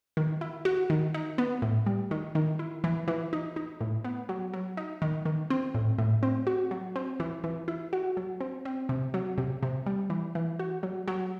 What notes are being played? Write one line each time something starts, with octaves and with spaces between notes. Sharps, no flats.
D#3
E4
F#4
D#3
D#4
B3
A2
G3
D#3
D#3
E4
E3
E3
D#4
D#4
A2
B3
F#3
F#3
D#4
D#3
D#3
C4
A2
A2
C4
F#4
F#3
C4
E3
E3
E4
F#4
F#3
C4
C4
C3
F#3
C3
C3
G3
E3
E3
F#4
F#3
F#3